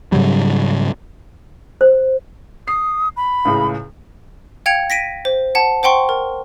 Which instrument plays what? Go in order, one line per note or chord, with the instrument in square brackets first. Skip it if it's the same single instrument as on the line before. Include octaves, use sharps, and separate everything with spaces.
[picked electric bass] G#2 C#3 F#3 G3
[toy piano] C5
[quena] D#6 [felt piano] C7
[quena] B5
[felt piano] C#2 A2 C#3
[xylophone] F5 G5 G#6 C#7 F7
A#6 B6 D7 D#7
C5
F#5 A5
C5 F#5 G5 C6 C#6
A#4